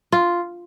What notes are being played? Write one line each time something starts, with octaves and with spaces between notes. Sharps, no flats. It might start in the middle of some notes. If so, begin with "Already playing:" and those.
F4